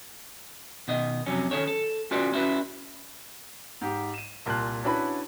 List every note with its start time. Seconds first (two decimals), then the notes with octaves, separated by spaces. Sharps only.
0.88 B2 D#3 D#5
1.26 F2 C3 F#3 C#4
1.51 D#3 C#4 A4 C#5
1.67 A4
2.11 C#4 F4 F#4 B4 D5
2.32 C#4 E4 F#4 B4
3.81 G#2 G4
4.14 D#7 E7
4.46 C2 A#2 A5 C6 F#6
4.84 C#4 D4 E4 F#4 B4 B5